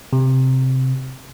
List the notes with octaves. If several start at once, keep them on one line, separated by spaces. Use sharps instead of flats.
C3